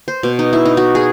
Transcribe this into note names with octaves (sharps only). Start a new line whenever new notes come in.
C5
B2
D#4
E4
D#4
F#4
G#4